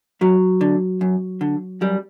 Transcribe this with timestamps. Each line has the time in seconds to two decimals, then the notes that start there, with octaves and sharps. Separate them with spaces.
0.21 F#2 F#3
0.61 D3
1.01 F#2
1.41 D3
1.81 F#2 G3